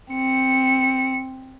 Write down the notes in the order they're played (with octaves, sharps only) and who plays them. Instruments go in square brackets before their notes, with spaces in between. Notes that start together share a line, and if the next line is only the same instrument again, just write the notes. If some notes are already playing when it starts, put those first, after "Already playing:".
[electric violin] C4 C#7